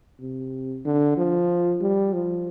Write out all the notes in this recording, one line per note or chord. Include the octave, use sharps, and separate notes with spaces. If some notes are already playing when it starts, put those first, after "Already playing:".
C3
D3
F3
G3
F3